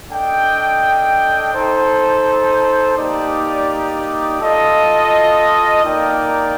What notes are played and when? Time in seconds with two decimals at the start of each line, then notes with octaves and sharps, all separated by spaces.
0.11 D4 A4 D#5 G5
1.54 D#4 A4 C5
2.97 A#3 D#4 G4 D5
4.41 F4 A4 D#5
5.84 A#3 D#4 A#4 D5 G5